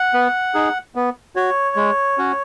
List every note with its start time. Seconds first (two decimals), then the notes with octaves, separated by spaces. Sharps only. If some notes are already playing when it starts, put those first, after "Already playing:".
Already playing: F#5
0.14 B3
0.54 D#4 G#4
0.95 B3
1.36 F#4 C#5
1.76 G#3
2.18 C#4 F#4